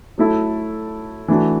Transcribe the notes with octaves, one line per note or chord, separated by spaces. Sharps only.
F#3 A3 E4 A4
E3 A3 D4 F#4